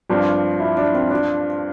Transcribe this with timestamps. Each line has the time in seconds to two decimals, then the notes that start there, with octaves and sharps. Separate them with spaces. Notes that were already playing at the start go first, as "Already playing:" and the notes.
0.09 G2 F3 C4 D4 G4
0.60 E4
0.77 D4
0.94 C4
1.11 D4